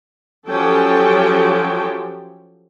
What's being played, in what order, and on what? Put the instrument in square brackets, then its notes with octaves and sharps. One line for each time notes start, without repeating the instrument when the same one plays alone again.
[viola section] F3 F#3 C#4 G4 A4 G5